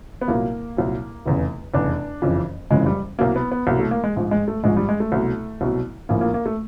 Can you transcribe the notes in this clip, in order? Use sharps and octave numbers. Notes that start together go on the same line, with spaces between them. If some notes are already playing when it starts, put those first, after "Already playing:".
B3
C2 A#2 F#3 A#3
C2 A#2 F#3
F1 E2 C#3
F1 E2 C#3 D4
F#1 F2 C#3 E3
F#1 F2 C#3 E3 G#3
G3
C2 B2 F#3 A#3
B3
B3
C2 B2 F#3 A#3
A3
A#3
G#3
A#1 G#2 F3
G#3
A3
A#1 G#2 F3 G#3
G3
G#3
A3
C2 B2 F#3
C2 B2 F#3
A#1 A2 F3 A#3
A#3
A#3
A3